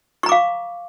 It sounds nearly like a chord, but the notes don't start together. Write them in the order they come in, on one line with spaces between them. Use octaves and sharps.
C#6 A#5 D6 F5